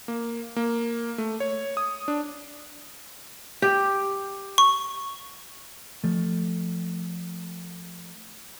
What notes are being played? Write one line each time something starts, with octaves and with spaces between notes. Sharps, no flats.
A#3
A#3
A3
C#5
D#6
D4
G4
C#6
F3 A3